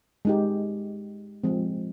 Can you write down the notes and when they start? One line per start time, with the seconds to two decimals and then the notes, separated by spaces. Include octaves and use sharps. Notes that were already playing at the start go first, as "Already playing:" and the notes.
0.25 G#3 D#4 G4
1.44 F3 G#3 C4